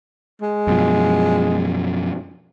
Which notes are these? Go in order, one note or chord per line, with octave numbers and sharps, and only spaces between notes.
G#3
F#2 B2 F3